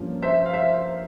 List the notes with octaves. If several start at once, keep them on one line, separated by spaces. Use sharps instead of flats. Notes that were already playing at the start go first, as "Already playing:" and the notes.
Already playing: G2 F3 A#3 C#4
C5 E5
F5
C5 E5